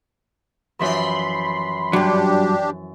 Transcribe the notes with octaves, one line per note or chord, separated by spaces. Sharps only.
F#2 E3 F3 B5 C6
G2 F#3 D4 G4